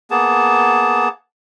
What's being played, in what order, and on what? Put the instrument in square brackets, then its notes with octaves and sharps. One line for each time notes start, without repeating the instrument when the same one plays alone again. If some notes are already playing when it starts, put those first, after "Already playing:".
[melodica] A#3 B3 G#4 A5